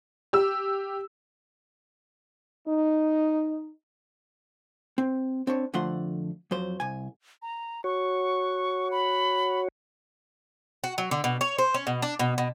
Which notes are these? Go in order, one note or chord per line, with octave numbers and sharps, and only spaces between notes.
G4 E6
D#4
C4
C4 D4 C#5
F2 D3 F3 A3 F#5 C6
F2 F#3 C5
C2 G#5
A#5
F#4 C#5 C#6
B5
F#4
F#3
D3
B2
C#5
C5
C#4
B2
D4
B2
B2